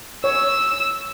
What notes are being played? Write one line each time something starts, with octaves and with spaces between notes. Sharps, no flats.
C#5 E6